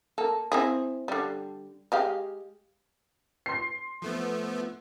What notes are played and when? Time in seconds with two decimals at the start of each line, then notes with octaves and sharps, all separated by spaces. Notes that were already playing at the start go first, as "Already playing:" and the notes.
0.18 A#3 A4
0.52 C4 E4 G#4
1.08 D3 G3
1.92 G#3 G4 F5
3.46 C6 C7
4.02 F3 A3 B3